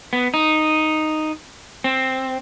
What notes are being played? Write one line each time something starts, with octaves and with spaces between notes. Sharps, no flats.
B3
D#4
C4